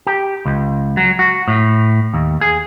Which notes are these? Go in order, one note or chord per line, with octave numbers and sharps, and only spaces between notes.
G4
C#2
F#3
F#4
A2
D#2
G#4